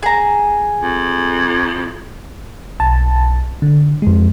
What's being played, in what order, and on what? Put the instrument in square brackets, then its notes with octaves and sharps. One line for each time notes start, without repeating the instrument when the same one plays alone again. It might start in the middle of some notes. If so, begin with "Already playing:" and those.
[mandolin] G#4 A#5
[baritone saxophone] F2
[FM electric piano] B1 A5
D3
F2 G#3